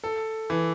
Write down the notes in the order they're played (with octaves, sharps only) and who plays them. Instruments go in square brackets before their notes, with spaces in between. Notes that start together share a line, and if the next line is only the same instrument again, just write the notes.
[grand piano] A4
E3